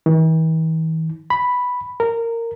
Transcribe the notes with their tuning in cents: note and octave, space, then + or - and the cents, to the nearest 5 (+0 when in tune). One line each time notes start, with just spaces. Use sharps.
E3 -45
B5 +0
A#4 -15